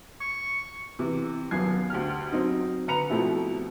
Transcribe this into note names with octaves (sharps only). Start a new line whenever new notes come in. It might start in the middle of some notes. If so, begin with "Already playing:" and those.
C#6
C3 E3
D#1 F#2 B3 G#6 C7
D2 G4 F6
F#3 C4 D#4
D3 B4 A#5 C#7 F7
B2 F3 A3 C4 E4 G4